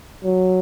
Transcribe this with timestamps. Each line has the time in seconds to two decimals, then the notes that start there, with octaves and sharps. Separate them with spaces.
0.24 F#3